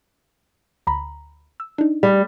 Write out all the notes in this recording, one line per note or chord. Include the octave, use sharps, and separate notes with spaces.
D2 A#5 B5
E6
D4 D#4
G3